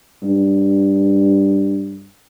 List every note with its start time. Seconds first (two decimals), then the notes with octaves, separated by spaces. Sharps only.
0.24 G2